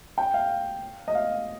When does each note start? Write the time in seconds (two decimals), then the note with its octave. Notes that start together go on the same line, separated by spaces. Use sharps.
0.18 G5
0.34 F5
1.08 D#5
1.15 F5